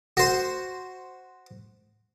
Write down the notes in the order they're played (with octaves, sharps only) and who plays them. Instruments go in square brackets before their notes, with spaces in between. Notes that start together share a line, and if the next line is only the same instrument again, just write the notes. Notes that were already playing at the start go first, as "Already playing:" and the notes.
[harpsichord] F#4 C5